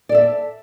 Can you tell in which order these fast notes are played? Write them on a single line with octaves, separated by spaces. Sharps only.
D5 A4 E5